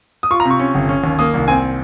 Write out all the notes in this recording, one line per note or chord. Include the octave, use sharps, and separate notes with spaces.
D#6
F4 C#6
A#5
C3
C#6
C#4
G1
C#4
D#2
A#3 D#6
C2
C4 G#5